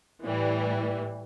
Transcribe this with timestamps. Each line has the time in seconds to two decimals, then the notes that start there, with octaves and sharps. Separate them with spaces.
0.25 A2 E3 G3